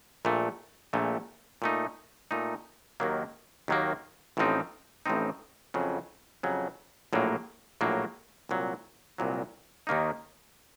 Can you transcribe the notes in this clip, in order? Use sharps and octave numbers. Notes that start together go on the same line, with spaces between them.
A#1 A#2 A3
A#1 A#2 A3
A#2 A3 D#4
A#2 A3 D#4
D#2 D#3 F#3 A#3
D#2 D#3 F#3 A#3
A1 A2 F3 C4 D#4
A1 A2 F3 C4 D#4
F2 C#3 F#3
F2 C#3 F#3
A#1 A2 F#3 A#3
A#1 A2 F#3 A#3
C2 A#2 F#3
C2 A#2 F#3
D#2 D#3 A#3 D#4